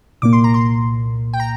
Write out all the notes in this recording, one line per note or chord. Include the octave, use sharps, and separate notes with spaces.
C2 A#2 A#3 D6
C6
A#5
C6
G5
A#5